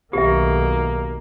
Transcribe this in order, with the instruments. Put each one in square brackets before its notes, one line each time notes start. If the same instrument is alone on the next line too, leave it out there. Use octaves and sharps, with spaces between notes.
[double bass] B1 D#3 [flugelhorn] A#3 [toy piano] G4 E5